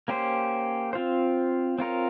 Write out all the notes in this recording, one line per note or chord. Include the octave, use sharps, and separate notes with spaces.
A#3 C#4 G4 C5
C4 F4 C5
C4 F4 A#4 C#5